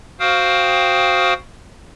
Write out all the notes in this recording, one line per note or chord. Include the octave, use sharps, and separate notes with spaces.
F#4 C5 F5 G5 D#6 F6